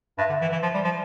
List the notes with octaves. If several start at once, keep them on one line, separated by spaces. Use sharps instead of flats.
G2 E5
D3
E3
E3
F3
G3
F3